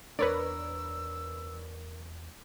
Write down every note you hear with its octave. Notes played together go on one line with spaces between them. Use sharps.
E2 D4 A#4 B4 C#5 D5 E6